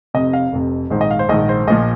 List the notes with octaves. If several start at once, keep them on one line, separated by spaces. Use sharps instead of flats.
F1 F2 C3 D#5
F5
F1 F2 C3
A#1 G#2 D#3 C5
D#5
F5
C5
A#1 G#2 D#3 D#5
C5
A#1 A#2 F3 D#5